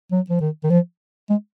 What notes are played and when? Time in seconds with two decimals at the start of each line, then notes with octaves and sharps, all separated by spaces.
0.11 F#3
0.30 F3
0.40 D#3
0.64 D#3
0.70 F3
1.29 G#3